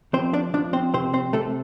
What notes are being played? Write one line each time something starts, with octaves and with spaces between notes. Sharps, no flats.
F3 C4 C5
D4 D5
F3 D4 D5
C4 C5
C3 C4 C5
C4 C5
C3 A3 A4